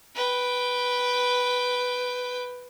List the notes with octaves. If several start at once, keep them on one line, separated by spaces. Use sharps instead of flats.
B4 G5